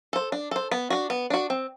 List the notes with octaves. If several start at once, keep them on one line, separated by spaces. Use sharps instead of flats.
A4 C5
D4
A4 C5
B3
D4 F#4
B3
D4 F#4
C4